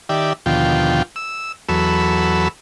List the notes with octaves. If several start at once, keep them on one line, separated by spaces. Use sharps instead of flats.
D#3 G4 D5 E5
D#2 B2 D3 F3 F4 G5
E6
E2 F#3 A4 B5 E6